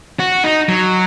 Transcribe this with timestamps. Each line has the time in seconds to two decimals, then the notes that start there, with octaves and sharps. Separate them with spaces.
0.19 F#4
0.44 D#4
0.69 F#3